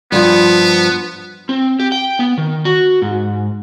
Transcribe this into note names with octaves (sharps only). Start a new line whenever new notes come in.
G2 F3 B3
C4
G4
G5
B3
D#3
F#4
G#2